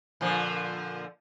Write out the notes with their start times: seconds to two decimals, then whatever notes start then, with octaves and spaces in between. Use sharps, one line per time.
0.21 A#2 D3 F3